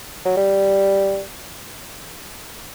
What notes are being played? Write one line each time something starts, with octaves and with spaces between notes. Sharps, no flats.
F#3
G3